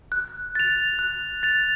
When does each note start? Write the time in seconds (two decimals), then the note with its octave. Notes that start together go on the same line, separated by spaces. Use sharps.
0.12 F#6
0.55 A6 F7
0.99 F#6
1.43 A6 F7